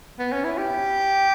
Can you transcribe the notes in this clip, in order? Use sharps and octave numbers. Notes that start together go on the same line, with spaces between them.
B3
C#4
E4
G4